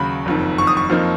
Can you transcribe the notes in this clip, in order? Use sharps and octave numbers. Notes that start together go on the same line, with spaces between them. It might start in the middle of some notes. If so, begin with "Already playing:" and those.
Already playing: D#2 C#3 F#3 B5
F#1 F2 D#3
C#6
D#6
C#6
F2 F3 A#3 D#4